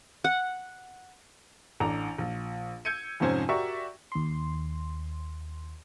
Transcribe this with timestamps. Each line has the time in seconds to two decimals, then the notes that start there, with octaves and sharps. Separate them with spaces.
0.24 F#5
1.80 A1 D4 A#5 F7
2.18 A#1
2.85 E6 G6 G#6 C#7 D#7
3.20 F2 G#2 C3 C#4 C5 G#5
3.49 F#4 G4 A#4 D5 E5 C#6
4.12 D#2 C6